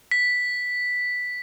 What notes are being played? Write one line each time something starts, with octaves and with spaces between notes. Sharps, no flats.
B6